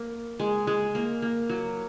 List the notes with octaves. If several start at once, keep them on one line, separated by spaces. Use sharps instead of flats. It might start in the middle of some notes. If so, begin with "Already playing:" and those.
Already playing: A#3
G#3
G#3
A#3
A#3
F#3